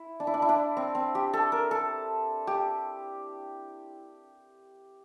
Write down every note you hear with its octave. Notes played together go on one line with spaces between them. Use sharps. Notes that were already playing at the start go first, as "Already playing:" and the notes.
Already playing: E4
D4
E4
D4
E4
D4
C4
C4
G4
A4
A#4
A4
G4